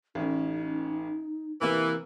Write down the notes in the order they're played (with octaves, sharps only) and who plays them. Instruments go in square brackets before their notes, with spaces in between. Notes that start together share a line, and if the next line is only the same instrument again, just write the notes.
[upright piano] A1 C#4 [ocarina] D#4
[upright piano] C3 A#3 E6 [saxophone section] E3